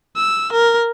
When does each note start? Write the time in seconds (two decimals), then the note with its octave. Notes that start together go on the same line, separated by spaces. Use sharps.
0.17 E6
0.53 A#4